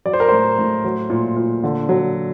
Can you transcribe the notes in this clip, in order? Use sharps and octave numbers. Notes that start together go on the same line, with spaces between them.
F#3 D5
C5
A#4
A2 C5
A2
F#3
A#2
A#2
D3
F#3